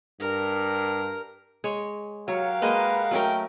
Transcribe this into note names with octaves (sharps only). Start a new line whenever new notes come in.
G2 A#4
G#3 C#5
F#3 G4 A#4 C#5 F5 F#5
G#3 A#3 B4 D#5
F#3 A3 C#4 A#4 D#5 G5